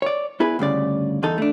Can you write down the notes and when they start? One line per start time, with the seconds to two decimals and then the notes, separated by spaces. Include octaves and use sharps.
0.02 C#5 D5
0.40 B3 E4 G#4 B4
0.59 D2 G2 C#3 D5
1.23 E2 D#4 A4
1.38 A3 D4